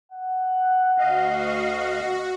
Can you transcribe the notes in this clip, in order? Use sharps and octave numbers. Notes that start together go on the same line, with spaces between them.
F#5
D2 F#4 D#5 F5